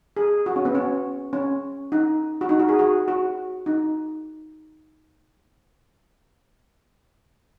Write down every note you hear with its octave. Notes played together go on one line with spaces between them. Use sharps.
G#4
F#4
C#4
B3
C#4
C#4
D#4
F#4
D#4
F#4
G#4
F#4
F#4
D#4